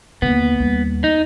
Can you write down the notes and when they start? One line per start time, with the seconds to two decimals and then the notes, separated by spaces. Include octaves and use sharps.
0.22 D#2 D3 B3
0.60 D#2 G3
1.04 D#4